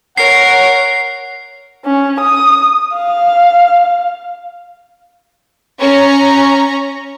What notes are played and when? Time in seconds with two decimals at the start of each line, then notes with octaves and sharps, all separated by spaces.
0.18 A#4 C#5 F#5 C7
1.85 C#4
2.20 D#6
2.94 F5
5.79 C#4 A#5